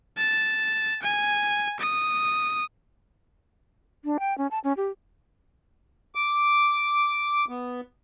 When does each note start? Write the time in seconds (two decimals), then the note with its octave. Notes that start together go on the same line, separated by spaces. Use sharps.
0.17 A5
1.02 G#5
1.80 D#6
4.05 D4
4.20 G5
4.38 C#4
4.51 A5
4.64 C#4
4.77 G4
6.15 D6
7.49 B3